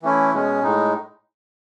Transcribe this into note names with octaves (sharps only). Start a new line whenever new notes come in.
E3 A3 C#4 E4
B2 G#3 C#4
A2 G#3 D#4